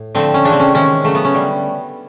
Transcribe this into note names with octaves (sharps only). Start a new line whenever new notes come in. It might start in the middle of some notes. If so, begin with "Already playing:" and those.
Already playing: A2
D3 F3 A3 C4
C#4
C#3 E3 A3 D4
C4
C#4
C3 D#3 G#3 C#4
C#3 F#3 A3
B3
C#4
D3 G3